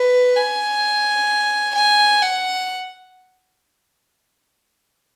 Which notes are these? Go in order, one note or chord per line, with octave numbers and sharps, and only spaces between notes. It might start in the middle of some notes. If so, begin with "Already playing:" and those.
Already playing: B4
G#5
G#5
F#5